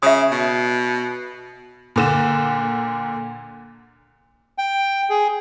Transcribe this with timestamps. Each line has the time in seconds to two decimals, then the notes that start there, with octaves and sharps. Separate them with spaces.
0.03 C#3 E5 D#6
0.31 B2
1.96 A#2 D3 E7
4.58 G5
5.10 G#4